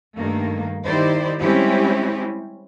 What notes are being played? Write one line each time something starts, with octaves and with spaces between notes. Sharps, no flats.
G2 D#3 A3 A#3
D#3 D#4 E4 G4 C5 D5
G3 G#3 C4 C#4 E4 G4